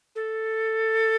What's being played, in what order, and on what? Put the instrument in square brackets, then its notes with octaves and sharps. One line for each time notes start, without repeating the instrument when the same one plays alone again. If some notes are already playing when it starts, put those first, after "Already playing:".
[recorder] A4